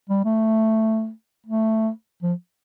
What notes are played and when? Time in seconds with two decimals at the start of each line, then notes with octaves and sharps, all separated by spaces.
0.09 G3
0.25 A3
1.46 A3
2.22 F3